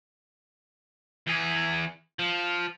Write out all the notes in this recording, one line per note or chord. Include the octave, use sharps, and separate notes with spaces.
E2 G#4
F3